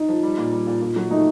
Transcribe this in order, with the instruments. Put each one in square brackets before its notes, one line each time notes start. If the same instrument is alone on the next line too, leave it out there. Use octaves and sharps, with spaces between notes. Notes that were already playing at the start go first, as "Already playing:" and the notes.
Already playing: [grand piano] D#4
[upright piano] F3
G3
A#2
G3
A#2
A#2
F#3
[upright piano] A3 [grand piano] D#4